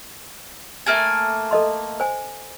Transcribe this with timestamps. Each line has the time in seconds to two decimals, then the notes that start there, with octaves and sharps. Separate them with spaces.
0.86 A3 A#3 G#5
1.51 A4 D#5 C6
2.00 C5 G#5